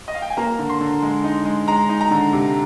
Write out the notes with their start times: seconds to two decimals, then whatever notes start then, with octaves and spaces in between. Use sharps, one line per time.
0.08 D#5
0.15 F5
0.22 G5
0.30 G#5
0.37 A#3 A#5
0.59 D3
0.69 C6
0.81 D3
1.02 G#3
1.24 D#4
1.45 G#3
1.67 G#3 A#5
1.89 D#4
2.01 A#5
2.11 D3
2.33 C3